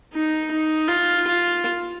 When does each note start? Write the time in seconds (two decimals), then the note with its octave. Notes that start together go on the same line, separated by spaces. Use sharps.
0.13 D#4
0.51 D#4
0.88 F4
1.27 F4